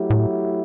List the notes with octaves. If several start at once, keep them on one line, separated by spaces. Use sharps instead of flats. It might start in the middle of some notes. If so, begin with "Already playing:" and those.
Already playing: F#3 A3 E4 G4
A2